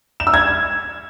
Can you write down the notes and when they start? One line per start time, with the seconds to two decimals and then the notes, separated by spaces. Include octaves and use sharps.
0.20 E7
0.27 E6
0.34 G#6